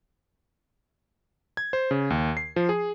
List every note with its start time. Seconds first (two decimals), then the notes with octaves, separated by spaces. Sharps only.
1.57 G#6
1.73 C5
1.91 C#3
2.10 D#2
2.37 C7
2.56 F3
2.69 G#4